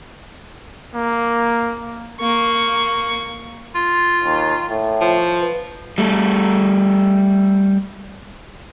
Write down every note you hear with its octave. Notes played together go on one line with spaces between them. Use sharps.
A#3
A#3 C#6
F4
D#2
A2
F3
B4
G3 A3